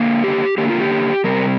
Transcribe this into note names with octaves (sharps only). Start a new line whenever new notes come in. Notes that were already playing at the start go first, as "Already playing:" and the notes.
Already playing: D3 A#3
G4
D3 A#3 G4
F4
G4
C3 G3 C4 A#4